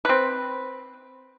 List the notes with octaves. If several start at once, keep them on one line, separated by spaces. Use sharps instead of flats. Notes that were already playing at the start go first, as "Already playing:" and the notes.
C4 B4